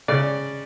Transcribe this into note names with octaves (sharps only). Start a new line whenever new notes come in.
C#3 D5